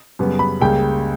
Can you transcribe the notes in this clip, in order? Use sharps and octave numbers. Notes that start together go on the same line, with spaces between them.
F#2 C#3 G3 B3
B5
C#2 C#3 G3 A#3 G5